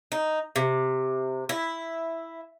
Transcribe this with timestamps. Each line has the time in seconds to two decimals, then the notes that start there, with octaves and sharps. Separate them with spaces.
0.12 D#4
0.56 C3
1.49 E4